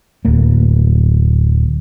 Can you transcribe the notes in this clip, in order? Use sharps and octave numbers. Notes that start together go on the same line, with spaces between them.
D1 A#3